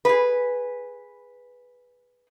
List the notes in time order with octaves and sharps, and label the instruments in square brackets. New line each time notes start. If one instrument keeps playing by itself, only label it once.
[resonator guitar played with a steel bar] G#4 B4